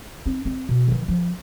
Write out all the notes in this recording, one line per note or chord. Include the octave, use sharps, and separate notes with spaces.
C4 D#4
C4
B2
D#3 E3
F3